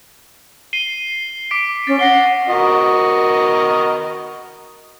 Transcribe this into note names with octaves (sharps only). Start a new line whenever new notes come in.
C7 D#7 G7
D6 B6 D7
C#4 A6
F#5 A#6 C7 G7
F#4 A#4 D#5